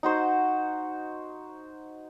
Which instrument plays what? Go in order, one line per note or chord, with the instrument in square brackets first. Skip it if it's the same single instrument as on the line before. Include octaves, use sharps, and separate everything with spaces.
[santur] D#4 F#4 C5